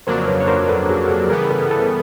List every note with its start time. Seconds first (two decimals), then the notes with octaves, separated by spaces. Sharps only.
0.07 F2 C#3 F#3 A#3 D4 A#4 C5
0.27 B4 C#5
0.40 C#5
0.48 A#4 C5
0.68 A4 B4
0.89 F#4 G#4
1.09 G4 A4
1.30 C#3 E3 G3 B3 G#4 A#4
1.50 A4 B4
1.71 A4 B4